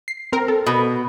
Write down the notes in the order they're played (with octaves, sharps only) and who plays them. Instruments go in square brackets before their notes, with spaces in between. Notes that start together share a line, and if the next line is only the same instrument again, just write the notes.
[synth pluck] C7
C4 A#4
A4
[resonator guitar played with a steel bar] B2